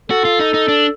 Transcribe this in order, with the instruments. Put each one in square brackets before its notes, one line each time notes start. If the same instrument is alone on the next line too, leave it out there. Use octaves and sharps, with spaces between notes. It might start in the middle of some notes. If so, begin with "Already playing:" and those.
[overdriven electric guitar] F#4 [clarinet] A4
[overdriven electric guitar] F4
D#4
D#4
D4